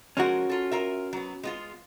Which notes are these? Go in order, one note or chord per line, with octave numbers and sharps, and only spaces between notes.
F3 G#3 C#4 F#4 A#4
F4 A4
F4 A#4 E5
F#3 B3
G#3 B3 F4